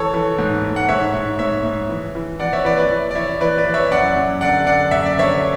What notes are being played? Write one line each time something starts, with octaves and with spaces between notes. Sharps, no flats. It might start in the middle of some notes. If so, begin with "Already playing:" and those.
Already playing: E3 A4 C#5
E3
G#2
G#2
F#5
G#2 C#5 E5
G#2
G#2 C#5 E5
G#2
E3
E3
E3 D5 F#5
C#5 E5
E3 B4 D5
B4 D5
E3
D5
E3 C#5 E5
E3 B4 D5
B4 D5
E3
C#5 E5
F#2 D5 F#5
F#2
D3 D5 F#5
D3 D5 F#5
F#2 E5
D5
D3 C#5 E5